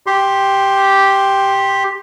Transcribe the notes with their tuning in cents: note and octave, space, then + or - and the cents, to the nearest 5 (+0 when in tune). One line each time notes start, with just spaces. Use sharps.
G4 +0 C6 +10